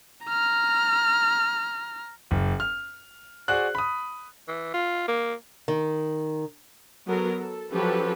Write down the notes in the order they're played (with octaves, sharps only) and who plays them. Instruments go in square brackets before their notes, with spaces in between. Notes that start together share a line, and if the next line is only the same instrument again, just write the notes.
[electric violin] A#5 F6
[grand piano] F#1
F6
F#4 G#4 C5 D5 F#6
B5 D#6
[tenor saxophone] E3
F4
A#3
[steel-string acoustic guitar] D#3
[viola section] F#3 B3 A4 A#4
A4
F3 F#3 C#4 G4 A4 B4